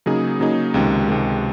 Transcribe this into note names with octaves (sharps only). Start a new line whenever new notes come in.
C#3 F#3 A#3 D#4 G#4
C#3 F#3 A#3 D#4 G#4
C#2 C3 D#3 G#3
C#2 C3 D#3 G#3